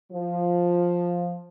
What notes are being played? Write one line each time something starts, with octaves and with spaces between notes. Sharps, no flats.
F3